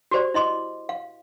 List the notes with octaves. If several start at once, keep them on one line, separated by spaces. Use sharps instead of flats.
F#4 G4 C5 D5
E4 D#5 C6 D6
F5